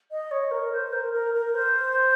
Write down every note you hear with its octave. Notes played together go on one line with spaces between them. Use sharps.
D#5
C#5
A#4
C5
A#4
A#4
A#4
C5